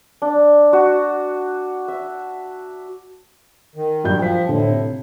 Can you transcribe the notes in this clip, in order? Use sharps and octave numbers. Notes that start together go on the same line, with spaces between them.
D4
F#4
E5
D#3
G2 F#3 G6
F3 G5 B6
A2 D3
C3